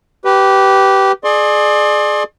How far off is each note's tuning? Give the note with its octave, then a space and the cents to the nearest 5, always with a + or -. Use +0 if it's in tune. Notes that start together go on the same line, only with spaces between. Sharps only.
G4 -15 B4 +0
G#4 +25 D5 +30 C6 +30